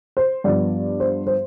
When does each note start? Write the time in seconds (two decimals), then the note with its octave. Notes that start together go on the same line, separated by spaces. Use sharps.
0.17 C5
0.44 G2 F3 B3 D5
1.00 C5
1.27 C5